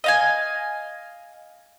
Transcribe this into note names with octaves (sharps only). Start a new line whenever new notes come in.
D#5 F5 G#5